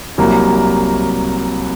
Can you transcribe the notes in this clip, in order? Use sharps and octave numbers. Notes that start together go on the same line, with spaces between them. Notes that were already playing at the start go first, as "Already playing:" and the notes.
C2 C3 F#3 A#3